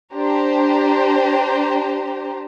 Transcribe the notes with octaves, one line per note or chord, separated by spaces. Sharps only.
D4 G4 C5 A#5